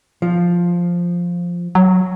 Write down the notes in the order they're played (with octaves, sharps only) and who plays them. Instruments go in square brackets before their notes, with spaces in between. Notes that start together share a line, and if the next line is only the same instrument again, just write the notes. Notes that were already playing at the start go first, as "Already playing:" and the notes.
[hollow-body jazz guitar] F3
[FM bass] F#3